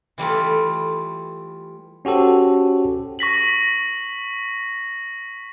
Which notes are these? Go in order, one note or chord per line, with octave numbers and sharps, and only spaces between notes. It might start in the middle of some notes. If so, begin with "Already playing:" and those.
E3 G3 A3 F4
C#4 F#4 G4 A4 C5
C#6 A#6 B6 F#7